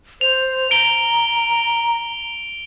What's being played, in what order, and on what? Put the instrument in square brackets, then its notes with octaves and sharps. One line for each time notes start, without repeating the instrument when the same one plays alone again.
[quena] C5 [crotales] F7
[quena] A#5 [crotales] D7 G7